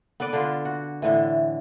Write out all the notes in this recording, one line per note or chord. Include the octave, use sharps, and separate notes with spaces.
B3 A4 B4 D5
D3 F4
F#4
A2 D3 E3